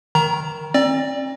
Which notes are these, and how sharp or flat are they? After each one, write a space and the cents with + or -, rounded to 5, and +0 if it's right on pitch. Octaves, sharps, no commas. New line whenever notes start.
D#3 +0 A#5 +20
C4 +35 D5 +0